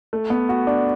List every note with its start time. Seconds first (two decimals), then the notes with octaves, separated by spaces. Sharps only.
0.13 A3
0.30 B3
0.49 F#4
0.67 D4